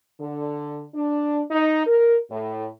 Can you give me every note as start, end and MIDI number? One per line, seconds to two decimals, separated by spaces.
0.20 0.84 50
0.94 1.42 62
1.51 1.83 63
1.87 2.17 70
2.30 2.67 45